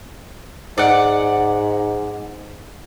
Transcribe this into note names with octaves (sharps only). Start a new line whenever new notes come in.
G#2 D5 F#5